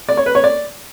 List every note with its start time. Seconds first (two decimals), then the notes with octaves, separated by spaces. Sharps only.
0.09 D5
0.17 C#5
0.26 B4
0.35 C#5
0.44 D5